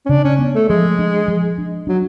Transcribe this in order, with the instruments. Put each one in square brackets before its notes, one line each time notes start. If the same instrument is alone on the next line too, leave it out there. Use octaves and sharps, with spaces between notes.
[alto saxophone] C#4
[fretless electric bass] C#3 [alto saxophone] D4
[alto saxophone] C#4
[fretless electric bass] B3
[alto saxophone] A3
[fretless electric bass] F3 [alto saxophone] G#3
[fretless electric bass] D4
F3
D4
[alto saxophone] F#3 [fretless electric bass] D4